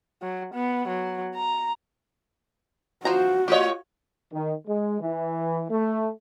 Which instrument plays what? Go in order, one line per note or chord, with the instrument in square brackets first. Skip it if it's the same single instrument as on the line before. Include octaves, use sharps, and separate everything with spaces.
[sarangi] F#3
B3
F#3
A#5
[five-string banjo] F3 C5 A#5 [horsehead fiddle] F#4
[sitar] A3 F4 C#5 [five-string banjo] G4 D#5
[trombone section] D#3
G#3
E3
A3